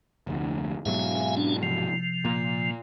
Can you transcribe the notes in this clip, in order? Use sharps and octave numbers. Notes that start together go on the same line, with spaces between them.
F1 D2
G#2 B2 F#3 E5 F5 G#5
C#4 D4
C3 F3
A#2